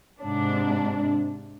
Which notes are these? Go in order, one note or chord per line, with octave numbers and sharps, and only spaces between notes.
G#2 C3 D4